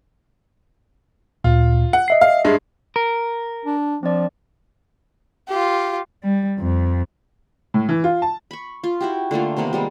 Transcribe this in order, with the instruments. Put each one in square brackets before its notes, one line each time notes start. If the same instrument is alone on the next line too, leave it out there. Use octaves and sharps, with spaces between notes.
[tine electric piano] D2 A#2 [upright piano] F4
[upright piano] F#5
[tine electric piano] D#5 E5 C7
[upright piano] F5
G2 G#3
[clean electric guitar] A#4
[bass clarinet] D4
[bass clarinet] F3 [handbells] C4 D4 D5
[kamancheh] F4 G4
[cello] G3
F2
[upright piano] A2
E3
F4
A5
[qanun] B5 C#6
F4
E4 F#4 G4
D3 A3 A#3 F4
C3 D#3 A#3 B3
G3 G#3 A#3